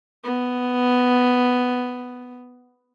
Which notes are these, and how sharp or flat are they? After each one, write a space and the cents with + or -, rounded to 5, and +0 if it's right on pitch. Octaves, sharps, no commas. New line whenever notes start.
B3 +5